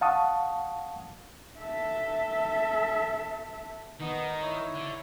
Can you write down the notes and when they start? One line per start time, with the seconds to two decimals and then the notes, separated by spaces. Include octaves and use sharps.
0.01 F5 F#5 A5 C#6 D#6
1.58 A4 E5
4.00 D#3 B3 D#4
4.42 E4 C#5
4.75 D3